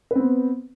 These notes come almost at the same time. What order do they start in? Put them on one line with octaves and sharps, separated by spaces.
B4 C4 B3